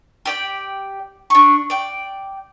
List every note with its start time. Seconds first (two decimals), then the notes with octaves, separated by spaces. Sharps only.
0.26 G4 D5 G5
1.30 D4 C#6
1.70 D5 G5